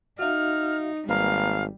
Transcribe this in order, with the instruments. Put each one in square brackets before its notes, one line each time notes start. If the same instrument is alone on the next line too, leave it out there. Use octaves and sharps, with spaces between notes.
[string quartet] D#4 [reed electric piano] F#4 E5 F5 [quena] F6
[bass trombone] G#1 [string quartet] G3 [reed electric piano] A#3 B4 A#5 [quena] F5